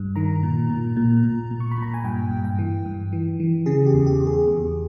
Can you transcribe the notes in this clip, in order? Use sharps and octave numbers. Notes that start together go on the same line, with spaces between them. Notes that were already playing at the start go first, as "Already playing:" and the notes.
Already playing: G2
D#3 A#5
A#2
A#2
A#2
A#2
A#2
C#6
B5
A#2 A#5
G#5
G2 G5
G2
G5
E3
G2
E3
E3
C#3 G#4
G4
E2
G4
E2
G#4
E2